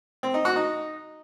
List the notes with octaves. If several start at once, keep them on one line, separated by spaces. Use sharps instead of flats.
C4
D#4
F#4
D#4